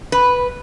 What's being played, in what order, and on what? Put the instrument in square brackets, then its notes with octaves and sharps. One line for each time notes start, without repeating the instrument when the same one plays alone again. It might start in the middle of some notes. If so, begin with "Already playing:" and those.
[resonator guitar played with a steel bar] B4